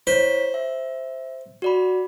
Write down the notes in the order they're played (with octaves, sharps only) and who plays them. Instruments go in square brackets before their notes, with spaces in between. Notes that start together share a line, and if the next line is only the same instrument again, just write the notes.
[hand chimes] E4 C#5 B6 [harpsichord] C5
[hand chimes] E5
F#4 D5 B5